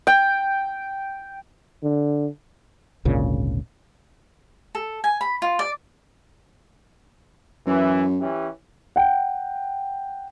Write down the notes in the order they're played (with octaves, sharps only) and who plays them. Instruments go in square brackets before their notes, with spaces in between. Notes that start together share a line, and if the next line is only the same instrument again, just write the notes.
[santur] G5
[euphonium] D3
[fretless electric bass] G#1 D2 A#2 C#3
[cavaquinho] A4
G#5
B5
F4
D5
[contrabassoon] F#2 [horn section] E3
[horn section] E3 C#4 G4
[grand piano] F#5 G5